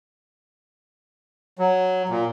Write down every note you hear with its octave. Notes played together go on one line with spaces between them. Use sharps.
F#3
A#2